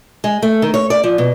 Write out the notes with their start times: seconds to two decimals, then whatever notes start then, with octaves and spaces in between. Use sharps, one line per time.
0.24 G#3
0.42 A3
0.62 D#3
0.74 C#5
0.90 D5
1.04 F3
1.18 B2